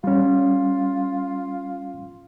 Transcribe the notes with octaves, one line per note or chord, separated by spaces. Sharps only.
G3 C#4 F4